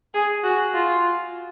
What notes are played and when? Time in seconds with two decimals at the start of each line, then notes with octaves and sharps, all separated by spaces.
0.14 G#4
0.43 F#4
0.74 F4